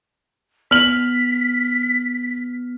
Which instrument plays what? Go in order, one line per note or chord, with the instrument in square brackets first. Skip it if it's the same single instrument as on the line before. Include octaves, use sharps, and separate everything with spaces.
[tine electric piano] B3 [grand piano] F6 F#7 [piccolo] B6